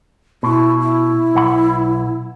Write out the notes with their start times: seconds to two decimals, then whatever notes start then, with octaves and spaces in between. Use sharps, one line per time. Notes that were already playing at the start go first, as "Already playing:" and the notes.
0.43 B2 E4
0.80 E4
1.35 B1 F#5 B5